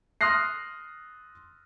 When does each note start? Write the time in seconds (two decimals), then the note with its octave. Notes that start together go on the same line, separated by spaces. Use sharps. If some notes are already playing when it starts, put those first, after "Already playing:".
0.21 C6 D#6 F6 F#6 A#6 C7